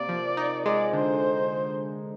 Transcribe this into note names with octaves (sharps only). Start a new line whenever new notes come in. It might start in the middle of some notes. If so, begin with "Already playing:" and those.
Already playing: C3 A#3 D5
F3
D#4
G#3 D5
D3 C5